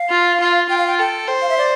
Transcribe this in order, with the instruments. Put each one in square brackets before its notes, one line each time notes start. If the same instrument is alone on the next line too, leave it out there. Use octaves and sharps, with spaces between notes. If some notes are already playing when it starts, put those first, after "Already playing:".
Already playing: [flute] F5
[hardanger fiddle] F4
F4
[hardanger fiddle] F4 [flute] G5
[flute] F5
G5
[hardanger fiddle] A4 [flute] G5
[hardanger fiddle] C5
[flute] F5
E5
D5